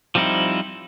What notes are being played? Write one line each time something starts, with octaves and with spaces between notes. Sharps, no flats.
F3 G3 C4 D#4 E4